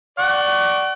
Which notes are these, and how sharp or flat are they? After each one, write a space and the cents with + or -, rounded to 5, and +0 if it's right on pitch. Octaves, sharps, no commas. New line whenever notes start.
D5 +0 F#5 +40 C#6 +0